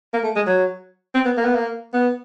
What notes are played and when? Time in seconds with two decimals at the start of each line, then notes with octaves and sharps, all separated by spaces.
0.13 A#3
0.24 A3
0.36 G#3
0.47 F#3
1.14 C4
1.25 B3
1.37 A#3
1.45 B3
1.55 A#3
1.93 B3